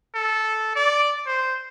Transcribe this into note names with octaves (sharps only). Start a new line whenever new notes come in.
A4
D5
C5